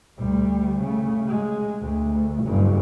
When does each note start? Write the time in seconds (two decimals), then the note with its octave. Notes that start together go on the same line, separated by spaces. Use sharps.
0.18 D2 G3
0.80 C#3 A3
1.28 G#3
1.81 D2
2.44 F#1 G2